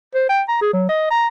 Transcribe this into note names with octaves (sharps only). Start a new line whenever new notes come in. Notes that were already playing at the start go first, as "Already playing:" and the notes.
C5
G5
A#5
G#4
F#3
D#5
A#5